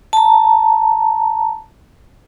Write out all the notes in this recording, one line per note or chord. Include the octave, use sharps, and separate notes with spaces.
A5 A#5